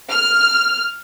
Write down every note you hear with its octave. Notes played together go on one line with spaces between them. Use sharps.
F6